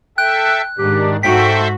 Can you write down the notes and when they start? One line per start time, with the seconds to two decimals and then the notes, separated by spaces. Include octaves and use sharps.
0.18 A4 E5 G5 F#6
0.78 G#2 D#3 D4 G4
1.23 G#2 F#4 A4 C5 E5 G5 B6